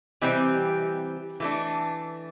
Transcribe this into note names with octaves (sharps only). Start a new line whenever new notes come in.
C3 E3 G3 C4 G4
E3 A3 D4